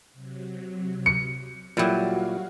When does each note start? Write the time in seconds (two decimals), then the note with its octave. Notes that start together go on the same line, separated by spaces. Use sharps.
0.13 C3 F#3
1.06 C#7
1.77 A#2 F#3 G3 E4 F#4 G4 F5